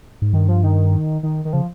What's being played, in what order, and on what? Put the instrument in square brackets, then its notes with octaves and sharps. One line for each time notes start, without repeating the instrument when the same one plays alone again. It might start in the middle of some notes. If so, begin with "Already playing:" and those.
[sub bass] G#2
[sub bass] G2 [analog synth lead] D#3
[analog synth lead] F3
D#3
D#3
D#3
[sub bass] C#3 [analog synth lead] F3